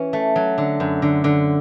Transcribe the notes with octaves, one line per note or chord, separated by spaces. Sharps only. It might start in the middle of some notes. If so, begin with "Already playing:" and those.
Already playing: E3 C#4
A3
F#3
D3
F#2
D3
D3